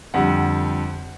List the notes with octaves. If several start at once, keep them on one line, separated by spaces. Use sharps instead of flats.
F2 D3 G3 F#5